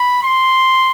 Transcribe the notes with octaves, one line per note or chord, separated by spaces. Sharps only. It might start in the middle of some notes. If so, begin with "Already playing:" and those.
Already playing: B5
C6